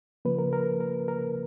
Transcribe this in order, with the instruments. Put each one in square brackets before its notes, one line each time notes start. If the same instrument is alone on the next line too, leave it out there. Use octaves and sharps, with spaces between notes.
[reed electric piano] C#3 F3 A#3 B4
A#4
A#4
A#4
A#4